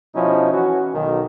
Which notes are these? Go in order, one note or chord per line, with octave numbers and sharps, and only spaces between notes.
B2 F3 C#4 D#4 E4
E3 C#4 F#4
B1 D#3